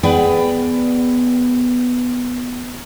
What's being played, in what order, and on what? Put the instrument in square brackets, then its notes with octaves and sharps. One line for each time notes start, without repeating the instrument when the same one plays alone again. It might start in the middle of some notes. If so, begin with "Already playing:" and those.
[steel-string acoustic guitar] B3 G#4 B4 D5 G5